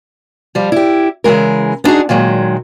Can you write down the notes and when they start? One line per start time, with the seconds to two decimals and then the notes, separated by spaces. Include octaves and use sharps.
0.55 F3 G3
0.72 E4 G4
1.24 C#3 E3 F3 G#3 A#4
1.84 B3 D4 D#4 F#4 G#4
2.09 A#2 D#3 F#3 G#3